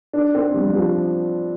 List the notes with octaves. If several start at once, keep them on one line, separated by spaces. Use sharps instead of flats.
D4
C4
G3
G3
F3